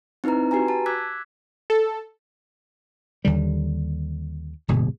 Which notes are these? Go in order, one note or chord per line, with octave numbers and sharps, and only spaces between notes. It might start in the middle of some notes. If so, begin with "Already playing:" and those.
C4 D#4 E4 B4 A#5
F#4 G4 B4 G#5 A#5
A5
D6 E6 F#6 G#6 B6
A4
D#2 D3 G3
D1 G1 G#2 B2